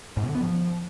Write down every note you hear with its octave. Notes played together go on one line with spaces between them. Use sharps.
G#2
B2
D3
B3
F3